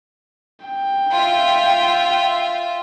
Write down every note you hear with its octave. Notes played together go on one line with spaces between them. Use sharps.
G5
F4 E5